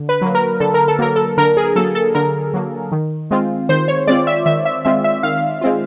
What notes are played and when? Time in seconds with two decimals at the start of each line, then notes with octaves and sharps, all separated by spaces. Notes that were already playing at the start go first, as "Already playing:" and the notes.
Already playing: D3
0.09 B4
0.21 F#3 A#3
0.35 A#4
0.60 D3 A4
0.74 A#4
0.88 A4
0.99 F#3 A#3 A#4
1.16 A4
1.37 D3 A#4
1.57 G#4
1.76 F#3 A#3 A4
1.95 A4
2.15 D3 A#4
2.54 F#3 A#3
2.92 D#3
3.31 G#3 C4 F4
3.69 D#3 C5
3.88 C#5
4.07 G#3 C4 F4 D5
4.27 E5
4.46 D#3 E5
4.65 E5
4.85 G#3 C4 F4 E5
5.04 E5
5.23 D#3 F5
5.61 G#3 C4 F4